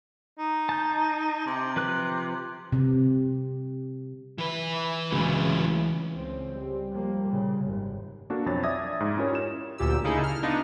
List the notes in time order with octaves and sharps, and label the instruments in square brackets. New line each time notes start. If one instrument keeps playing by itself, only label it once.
[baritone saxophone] D#4
[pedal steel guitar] A5 G6
[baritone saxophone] C3
[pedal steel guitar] F3 B4 F#6
[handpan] C3
[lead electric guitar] E3 B4
[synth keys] C#2 C#3 E3 [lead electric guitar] A2 F#3
[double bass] C#2 C4
[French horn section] G3
[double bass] F3 A#3
A#2 C#3
G#1 F#2
[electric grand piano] A#3 D4 F#4 A4
B1 F2 C#5 A6
D5 E5 D6 D#6 G#6 A#6
G#2
C#4 E4 F4 G4 A#4 C#5
E7
[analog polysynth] D2 A#2 G4 E6
C#3 A#3 D#4 E4 G#4 A4
F6
B3 D4 D#4 F4